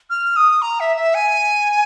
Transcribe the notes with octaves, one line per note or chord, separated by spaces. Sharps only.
F6
D#6
A#5
E5
E5
G#5